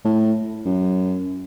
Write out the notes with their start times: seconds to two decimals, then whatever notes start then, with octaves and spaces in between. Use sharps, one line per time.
0.05 A2
0.65 F#2